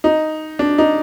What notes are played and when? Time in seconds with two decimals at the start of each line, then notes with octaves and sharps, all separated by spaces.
0.04 D#4
0.59 D4
0.78 D#4